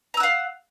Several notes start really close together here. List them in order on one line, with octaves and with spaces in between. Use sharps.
A#5 E6 F#5 F5